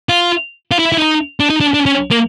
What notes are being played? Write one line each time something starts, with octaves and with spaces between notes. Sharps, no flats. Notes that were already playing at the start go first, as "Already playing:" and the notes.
F4
F4
E4
E4
D#4
D4
D#4
D4
D4
C#4
A#3